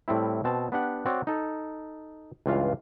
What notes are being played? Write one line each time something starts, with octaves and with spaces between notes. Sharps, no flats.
A2 G3 C4 E4
B2 C4 A5
B3 D4 G4 F#5
C4 F#4 C#5 D5
D#4 A4
C#2 G2 E3 F4 F5